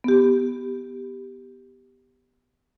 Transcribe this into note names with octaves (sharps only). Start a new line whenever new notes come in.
B3 G4